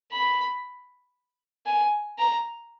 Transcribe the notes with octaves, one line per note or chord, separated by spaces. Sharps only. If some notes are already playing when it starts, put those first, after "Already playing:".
B5
G#5
A#5